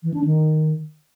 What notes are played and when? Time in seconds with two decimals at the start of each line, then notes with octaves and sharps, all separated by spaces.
0.03 E3
0.14 D4
0.25 D#3